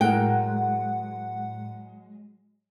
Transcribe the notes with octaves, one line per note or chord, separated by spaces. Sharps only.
A2 F#3 G#3 A#4 F#5 G5